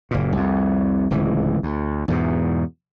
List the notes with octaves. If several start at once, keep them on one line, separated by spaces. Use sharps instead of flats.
F#1 A#2
C2 F2
D1 C#2 E3
D2
E2 G#2 B2